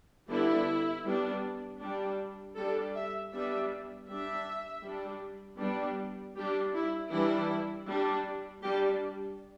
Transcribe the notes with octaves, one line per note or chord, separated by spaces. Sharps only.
D3 G3 B3 E4
G3 B3 D4
G3 D4
G3 D4 A4
E5
G3 B3 D4 E5
G3 D4 E5
G3 D4
G3 B3 D4
G3 D4 G4
E4
E3 G3 D4 E4
G3 D4
G3 D4 G4